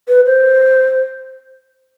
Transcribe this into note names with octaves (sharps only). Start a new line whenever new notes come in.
B4
C5